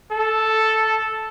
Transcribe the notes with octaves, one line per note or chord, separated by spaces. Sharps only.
A4